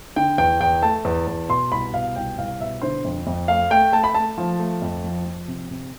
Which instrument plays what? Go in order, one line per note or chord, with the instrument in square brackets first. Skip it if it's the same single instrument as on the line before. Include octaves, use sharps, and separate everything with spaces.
[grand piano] D3 G5
E2 G5
E2 G5
A3 A5
E2
E2
B2 C6
C2 B5
B2 F5
C2 G5
C2 F5
B2 E5
D3 C5
F2
F2
A3 F5
A3 G5
A3 A5
B5
A3 A5
F3
A3
F2
F3
F3
C3
C3